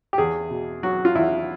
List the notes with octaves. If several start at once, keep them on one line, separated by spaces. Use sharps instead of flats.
G4
E2 G#4
B2
F#3 F#4
F4
E2 E4